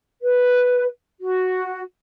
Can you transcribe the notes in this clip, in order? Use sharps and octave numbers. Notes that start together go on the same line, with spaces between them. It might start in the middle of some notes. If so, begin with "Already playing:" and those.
B4
F#4